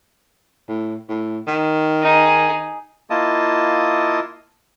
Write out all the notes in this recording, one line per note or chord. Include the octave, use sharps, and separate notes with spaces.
A2
A2
D#3
D#4 G#4
A#3 E4 F4 D#5 A5 D#6